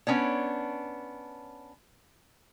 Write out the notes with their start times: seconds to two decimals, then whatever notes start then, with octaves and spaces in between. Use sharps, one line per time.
0.07 B3 C#4 D4 C#5